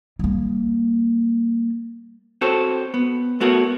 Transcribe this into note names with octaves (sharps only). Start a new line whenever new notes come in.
G3 A#3
C4 F#4 A4 C5 C#5
B3
A3 B3 F#4 A4 A#4 C#5